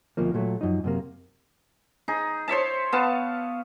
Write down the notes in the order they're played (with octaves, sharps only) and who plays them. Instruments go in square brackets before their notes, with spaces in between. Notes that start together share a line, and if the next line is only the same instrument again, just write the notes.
[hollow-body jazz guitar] D2 B2 F3 A#3
A#2 F#3 A3
F#2 F3 D#4
F#2 C3 A#3
[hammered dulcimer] D#4 G#4
C5 C#5 E5 A5
B3 F5 A5